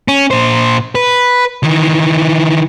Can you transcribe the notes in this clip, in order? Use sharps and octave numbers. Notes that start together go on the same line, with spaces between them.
C#4
A#2 C5
B4
D#3 E3